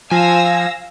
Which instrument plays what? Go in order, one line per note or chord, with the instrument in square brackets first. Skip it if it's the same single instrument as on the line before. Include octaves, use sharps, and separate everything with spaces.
[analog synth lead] F3 [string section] F5 E6 A#6 [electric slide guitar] G#5